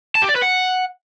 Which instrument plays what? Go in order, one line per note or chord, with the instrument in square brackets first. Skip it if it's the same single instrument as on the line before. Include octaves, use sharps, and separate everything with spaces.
[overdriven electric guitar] A5
G4
D5
B4
F#5